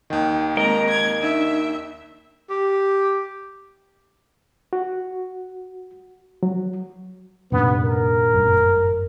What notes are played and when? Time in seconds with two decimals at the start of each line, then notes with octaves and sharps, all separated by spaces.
0.10 D#2 D#3 D#5 G5
0.57 G#3 A#3 C4 A#4 D#5 A#5
0.90 G#6
1.22 D4 D#4 E5
2.50 G4
4.73 F#4
6.43 F#3
7.52 D#1 F#2 C3 B3 D4
7.83 A#4
8.33 G1 F#2 A2